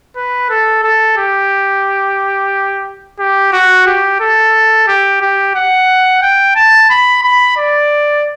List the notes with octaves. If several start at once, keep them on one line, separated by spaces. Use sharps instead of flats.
B4
A4
A4
G4
G4
F#4
G4
A4
G4
G4
F#5
G5
A5
B5
B5
D5